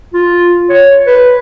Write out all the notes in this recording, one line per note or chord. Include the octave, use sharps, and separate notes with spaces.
F4
C#5
B4